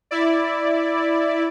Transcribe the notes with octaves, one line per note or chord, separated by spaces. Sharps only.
E4 D5